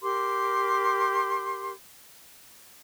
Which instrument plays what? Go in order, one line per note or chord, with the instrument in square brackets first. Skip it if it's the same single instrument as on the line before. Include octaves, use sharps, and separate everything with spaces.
[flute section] G4 A#4 C6 D6